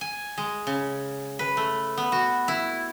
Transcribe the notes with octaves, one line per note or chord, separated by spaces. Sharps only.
G#5
G#3
C#3
B4
A3
B3
F#4
E4